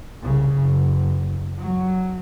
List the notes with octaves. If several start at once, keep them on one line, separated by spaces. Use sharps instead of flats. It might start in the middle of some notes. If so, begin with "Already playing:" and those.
C2 C#3
F#1
F#3